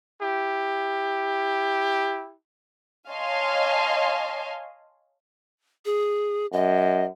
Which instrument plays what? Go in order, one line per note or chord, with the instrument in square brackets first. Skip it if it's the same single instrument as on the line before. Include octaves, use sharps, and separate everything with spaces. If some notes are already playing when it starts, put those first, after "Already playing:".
[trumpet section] E4 G4
[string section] C#5 D#5 F5 G#5 A5 C6
[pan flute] G#4
[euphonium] F#2 [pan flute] D#5